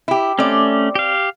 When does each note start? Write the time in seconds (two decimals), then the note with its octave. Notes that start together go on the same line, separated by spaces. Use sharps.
0.08 E4 G4
0.39 A3 C4 C#4 D5
0.95 G4 F5